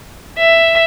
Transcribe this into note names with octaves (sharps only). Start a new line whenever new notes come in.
E5